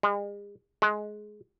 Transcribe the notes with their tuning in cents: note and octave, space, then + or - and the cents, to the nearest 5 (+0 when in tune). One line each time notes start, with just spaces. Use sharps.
G#3 -40
G#3 +20